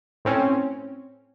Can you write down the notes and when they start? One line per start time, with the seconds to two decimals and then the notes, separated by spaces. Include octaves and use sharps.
0.25 A2 C4 C#4